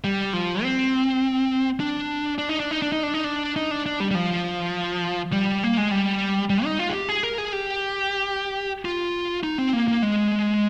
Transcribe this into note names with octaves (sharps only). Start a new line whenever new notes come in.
G3
F3
C4
D4
D4
D#4
D4
D#4
D4
D#4
D4
D#4
D4
D#4
D4
D4
G3
G3
F3
G3
A#3
G#3
G3
G3
D#4
F4
G#4
G4
G#4
A#4
G#4
G4
F4
D#4
C4
A#3
A#3
G#3